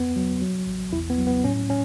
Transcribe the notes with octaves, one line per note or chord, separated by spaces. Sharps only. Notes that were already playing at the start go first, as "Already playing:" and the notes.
Already playing: E2 B3
F#3
F#3
A1
E2 E4
B3
F#3
B3
A2 C#4
C#4